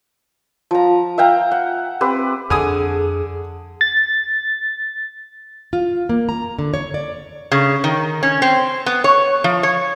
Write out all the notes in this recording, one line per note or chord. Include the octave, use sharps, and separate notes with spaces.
F3 A#5
E5 F5 G5 A#5
F#5
C4 G4 B4
F2 D3 D4 G#4 G#5 D#6
A6
F4
A#3
A#5
D3
C#5
D5
C#3
D#3
C#4
C4
B3
C#5
F3
C#5